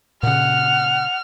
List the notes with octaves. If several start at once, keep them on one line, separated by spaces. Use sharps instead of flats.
A#2 C#3 F#5 F6